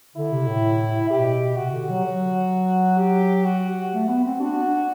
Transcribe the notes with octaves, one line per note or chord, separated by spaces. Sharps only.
D3 E4
C3
A2
B2 G4
C3 F#4
D3
F#3
F#3
G4
F#4
A3
B3
C4
D4 F#4
D4